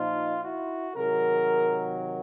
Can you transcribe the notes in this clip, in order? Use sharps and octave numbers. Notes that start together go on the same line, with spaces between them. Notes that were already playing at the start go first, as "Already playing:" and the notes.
Already playing: A#2 F3 D#4 F4
E4 F#4
C3 D#3 F#3 G#4 A#4